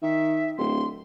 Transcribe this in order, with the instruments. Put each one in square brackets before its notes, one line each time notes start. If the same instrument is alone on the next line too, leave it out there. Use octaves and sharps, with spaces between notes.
[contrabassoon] D#3 [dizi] E5
[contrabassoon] D1 [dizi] C6